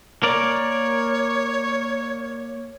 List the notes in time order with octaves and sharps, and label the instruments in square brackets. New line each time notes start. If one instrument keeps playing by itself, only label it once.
[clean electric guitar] A#3 A#4 D5 [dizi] C#5